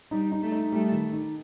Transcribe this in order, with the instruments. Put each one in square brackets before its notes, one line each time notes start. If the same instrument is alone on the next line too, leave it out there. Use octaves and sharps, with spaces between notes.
[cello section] G3 [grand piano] D#4
[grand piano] D#4
[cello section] A3
[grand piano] D#4
[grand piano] G3 [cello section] A3
[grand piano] D#3
D#4